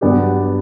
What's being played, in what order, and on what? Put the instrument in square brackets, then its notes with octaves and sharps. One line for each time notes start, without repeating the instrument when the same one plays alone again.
[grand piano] G2 F#3 B3 D4 G4